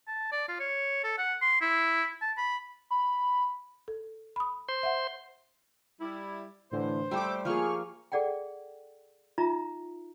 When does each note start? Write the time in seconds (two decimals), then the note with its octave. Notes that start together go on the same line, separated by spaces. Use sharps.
0.08 A5
0.32 D5
0.49 F4
0.60 C#5
1.04 A4
1.18 F#5
1.41 C6
1.61 E4
2.22 A5
2.38 B5
2.90 B5
3.88 A4
4.36 B5 D#6
4.69 C5 C6
4.83 E5 F#5
6.00 G3 E4
6.71 A2 D3 E3 C5
7.11 G3 A3 G4 D6 E6
7.45 F3 A#3 G#4 C#6 F6
8.12 G#4 A4 D5 F#5 G5
9.38 D#4 F4 E5 A#5